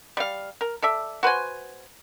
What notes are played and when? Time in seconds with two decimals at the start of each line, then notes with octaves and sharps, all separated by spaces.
0.17 G3 F5
0.61 A#4
0.82 A4 D5 E5
1.23 F#4 B4 C5 G#5